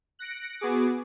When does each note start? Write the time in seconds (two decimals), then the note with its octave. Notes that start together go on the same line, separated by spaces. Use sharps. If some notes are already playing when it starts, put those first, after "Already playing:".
0.19 F#6 A#6 C#7 D7
0.60 B3 F#4 G#4 D6